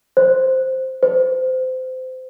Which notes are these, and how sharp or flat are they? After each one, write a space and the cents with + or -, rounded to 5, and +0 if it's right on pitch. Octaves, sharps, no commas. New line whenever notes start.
C5 +0
C5 -25